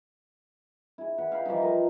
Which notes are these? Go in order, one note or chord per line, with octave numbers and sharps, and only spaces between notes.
E4 G#4
E3 F#5 B5
F5 G5 B5
E3 F3 G3 D#4
F4 A#4 B4